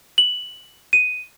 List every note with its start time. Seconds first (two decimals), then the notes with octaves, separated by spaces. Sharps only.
0.18 F#7
0.93 D#7